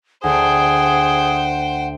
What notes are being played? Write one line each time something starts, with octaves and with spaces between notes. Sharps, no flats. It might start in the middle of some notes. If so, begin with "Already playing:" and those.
D2 G#4 C5 F#5 G5